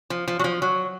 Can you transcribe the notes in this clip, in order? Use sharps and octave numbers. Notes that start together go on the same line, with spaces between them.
F3
F3
F#3
F3
F#3